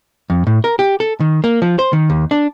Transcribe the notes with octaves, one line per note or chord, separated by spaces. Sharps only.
F2
A2
A#4
G4
A4
D#3
A#3
F3
C5
D#3
D#2
D4